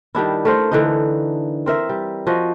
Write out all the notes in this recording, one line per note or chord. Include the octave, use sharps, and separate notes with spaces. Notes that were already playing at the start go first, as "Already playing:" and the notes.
D#3 G3 D4 E4
A3 A#4 C5
D3 E3 D#4
C4 A#4 E5
G3
F3 F#4 D#5